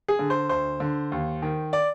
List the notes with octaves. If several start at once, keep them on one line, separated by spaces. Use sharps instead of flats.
G#4
D3
C5
D2 C5
D3
D#2
D#3
D5